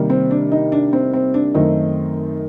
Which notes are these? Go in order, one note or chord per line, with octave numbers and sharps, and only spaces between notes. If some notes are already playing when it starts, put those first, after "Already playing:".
Already playing: C3 D#3 G3 A#3
C4
D4
D#4
D4
C4
C4
D4
F#2 D#3 A3 C4 D#4